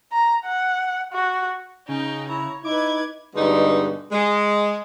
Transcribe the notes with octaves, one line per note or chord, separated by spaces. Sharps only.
A#5
F#5
F#4
C#3 D#4 G5
E4 C#5 A#5
D#4 E4 B4 D6 G#6
G2 B2 D3 G#3 D#4
G#3